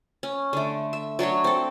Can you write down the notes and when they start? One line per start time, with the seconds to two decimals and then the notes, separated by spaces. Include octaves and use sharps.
0.23 C#4
0.53 D3 A3
0.93 E5
1.19 F#3 D4 F#4 C#5
1.44 C4 A4